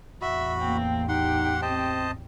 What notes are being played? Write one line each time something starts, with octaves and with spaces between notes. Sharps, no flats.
A1 E2 F#4 E5 B5
A#3 C4
D#4 G4 F#5 C6
C4 C5 D#5 A5